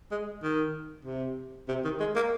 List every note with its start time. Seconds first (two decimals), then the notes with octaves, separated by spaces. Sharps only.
0.11 G#3
0.43 D#3
1.05 C3
1.68 C3
1.84 D#3
2.00 G#3
2.15 A#3